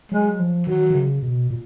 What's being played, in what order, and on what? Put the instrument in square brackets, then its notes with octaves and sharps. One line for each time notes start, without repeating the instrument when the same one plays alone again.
[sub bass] F#3 [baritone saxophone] G#3
[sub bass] F3
[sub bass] D#3 [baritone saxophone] F#3
[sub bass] D#3
C#3
B2
A#2